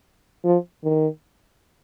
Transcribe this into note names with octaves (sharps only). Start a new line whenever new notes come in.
F3
D#3